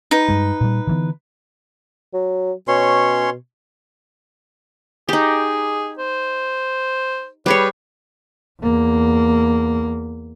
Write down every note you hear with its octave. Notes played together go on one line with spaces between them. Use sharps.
D#4 B4
G2 G3 G#3
A#2 G3
D3 E3 B3
F#3
B2 C#4 C#5 C6
D#4 G4 G#4
C5
G3 G#4 B4 C#5
E2 A#3